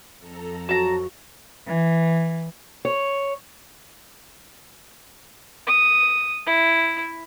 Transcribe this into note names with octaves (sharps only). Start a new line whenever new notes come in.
F2 A4 A#5
F2 F#3 F#4 A5 A#5
E3
C#5
D#6
E4